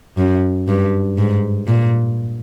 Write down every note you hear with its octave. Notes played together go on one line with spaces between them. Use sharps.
F#2
G2
G#2
A#2